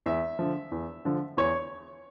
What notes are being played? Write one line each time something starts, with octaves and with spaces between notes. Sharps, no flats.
E2 E5
D3 F3
E2
D3 F3
E2 C#5